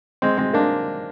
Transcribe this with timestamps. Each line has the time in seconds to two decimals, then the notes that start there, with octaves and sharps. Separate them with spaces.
0.22 G#3 C4
0.38 G#3 C4
0.53 A#3 D4